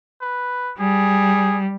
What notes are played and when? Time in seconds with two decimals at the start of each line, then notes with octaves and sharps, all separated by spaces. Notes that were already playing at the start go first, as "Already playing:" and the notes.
0.21 B4
0.79 G3 G#4